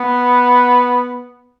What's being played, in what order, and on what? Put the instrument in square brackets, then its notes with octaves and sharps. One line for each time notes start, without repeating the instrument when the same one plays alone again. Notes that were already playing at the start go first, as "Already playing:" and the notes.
Already playing: [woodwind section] B3